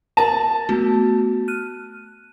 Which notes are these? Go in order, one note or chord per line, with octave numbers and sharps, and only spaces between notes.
A#4 A5 A#6
A3 B3 F#4
F6 F#6 D#7